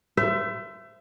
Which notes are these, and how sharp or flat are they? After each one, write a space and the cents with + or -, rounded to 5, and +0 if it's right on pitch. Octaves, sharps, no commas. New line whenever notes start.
C5 -25 E5 +25